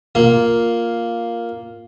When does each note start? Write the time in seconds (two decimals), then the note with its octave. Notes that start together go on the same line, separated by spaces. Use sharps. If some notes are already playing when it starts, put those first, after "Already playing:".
0.15 A#3 F4